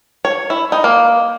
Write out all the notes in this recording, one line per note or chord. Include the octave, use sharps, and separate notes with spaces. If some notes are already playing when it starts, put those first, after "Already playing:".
C#5
E4
D#4
A#3